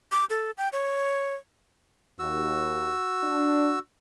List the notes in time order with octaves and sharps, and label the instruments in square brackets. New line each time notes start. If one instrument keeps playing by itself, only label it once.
[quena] D6
A4
G5
C#5
[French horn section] D#2 [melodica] F#4 E6
[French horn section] D4